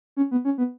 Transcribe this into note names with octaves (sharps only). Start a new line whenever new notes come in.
C#4
B3
C#4
B3